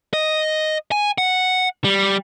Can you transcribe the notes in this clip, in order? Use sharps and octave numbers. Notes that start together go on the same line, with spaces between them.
D#5
G#5
F#5
G3